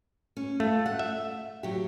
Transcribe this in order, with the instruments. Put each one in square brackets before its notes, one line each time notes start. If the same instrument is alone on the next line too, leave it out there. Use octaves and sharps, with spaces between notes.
[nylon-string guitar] C#4
[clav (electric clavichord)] A3 [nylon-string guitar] F4
[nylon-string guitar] F#5
[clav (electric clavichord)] E5
[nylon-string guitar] F#3 G4